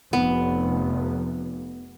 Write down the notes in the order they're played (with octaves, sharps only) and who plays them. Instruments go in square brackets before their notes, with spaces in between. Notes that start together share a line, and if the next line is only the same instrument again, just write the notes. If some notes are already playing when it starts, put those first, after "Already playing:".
[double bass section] F1 [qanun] B3